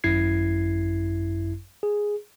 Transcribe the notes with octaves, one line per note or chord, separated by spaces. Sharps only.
G#1 F#2 E4 G#6 C7
G#4